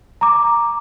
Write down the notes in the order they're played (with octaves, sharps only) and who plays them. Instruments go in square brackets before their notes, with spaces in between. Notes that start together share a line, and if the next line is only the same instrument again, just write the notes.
[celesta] A#5 D6